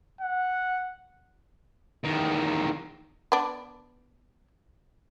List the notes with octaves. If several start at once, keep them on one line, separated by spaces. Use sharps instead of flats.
F#5
E2 D#3
B3 D4